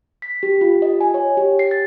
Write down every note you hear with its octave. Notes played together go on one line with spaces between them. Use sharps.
B6
G4
F4
D#5
G#5
C#5
G4
C7
A6